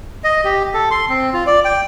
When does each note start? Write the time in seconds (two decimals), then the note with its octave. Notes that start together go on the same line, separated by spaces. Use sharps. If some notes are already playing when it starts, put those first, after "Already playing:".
0.24 D#5
0.44 G4
0.74 A4
0.91 C6
1.09 C4
1.33 F4
1.47 D5
1.65 G5